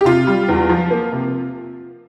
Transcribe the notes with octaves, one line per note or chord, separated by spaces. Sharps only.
G4
C3 F4
G3
E2
F3
A#3
C3